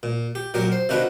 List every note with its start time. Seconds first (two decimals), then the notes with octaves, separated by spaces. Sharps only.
0.03 A#2
0.35 G4
0.54 A#2 F#3 G4 A#4
0.72 C5
0.89 C3 D#3 D4 F4 F#4 B4